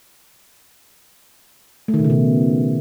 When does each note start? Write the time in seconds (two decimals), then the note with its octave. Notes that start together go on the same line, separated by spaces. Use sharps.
1.88 A3
1.94 D#3
1.99 B2
2.04 C#3
2.10 B2